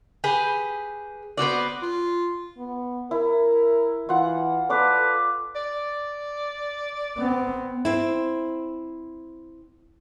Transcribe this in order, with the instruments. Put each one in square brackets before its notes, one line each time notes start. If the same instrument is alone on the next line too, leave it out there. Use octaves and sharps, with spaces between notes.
[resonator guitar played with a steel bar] G4 G#4 B4
B3 C4 F#4 D5
[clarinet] F4
[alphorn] B3
[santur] E4 [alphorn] A#4
[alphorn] E3 [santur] F4 F#5
[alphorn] A4 [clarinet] B4 [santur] D5 F5 D6
[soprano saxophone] D5
[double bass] B3 C4
[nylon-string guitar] C4 E4